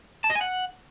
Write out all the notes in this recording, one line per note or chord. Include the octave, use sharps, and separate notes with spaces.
A5
D#5
G#5
F#5